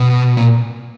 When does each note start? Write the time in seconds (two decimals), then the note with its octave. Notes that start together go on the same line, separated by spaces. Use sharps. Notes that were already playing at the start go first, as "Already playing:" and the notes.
Already playing: B2
0.37 A#2